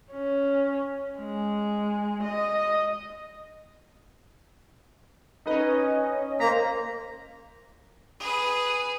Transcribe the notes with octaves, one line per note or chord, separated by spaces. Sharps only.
C#4
G#3
D#5
C#4 D#4 B4 D#5
A#3 C5 A#5 B6
G#4 B4